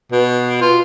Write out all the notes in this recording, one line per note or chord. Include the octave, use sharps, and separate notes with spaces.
B2
F4